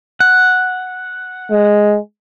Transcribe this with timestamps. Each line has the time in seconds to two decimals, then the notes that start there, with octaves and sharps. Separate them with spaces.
0.20 F#5
1.51 G#3